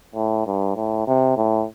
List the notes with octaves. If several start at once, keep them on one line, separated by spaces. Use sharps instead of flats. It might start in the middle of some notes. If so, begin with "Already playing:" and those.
A2
G2
A2
C3
A2